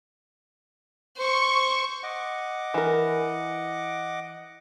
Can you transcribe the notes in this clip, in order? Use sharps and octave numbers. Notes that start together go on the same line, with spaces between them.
C5 C#6
D#5 F#5 D6
E3 A#4